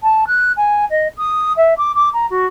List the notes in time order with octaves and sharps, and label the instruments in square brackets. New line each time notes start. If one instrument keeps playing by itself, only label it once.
[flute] A5
F#6
G#5
D#5
D#6
E5
D6
D6
A#5
F#4